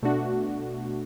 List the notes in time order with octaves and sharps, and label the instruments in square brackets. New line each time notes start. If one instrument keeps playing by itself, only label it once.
[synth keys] B2 A3 D4 F#4